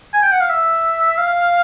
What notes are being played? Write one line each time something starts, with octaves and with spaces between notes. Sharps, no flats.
G#5
G5
F#5
F5
E5
F5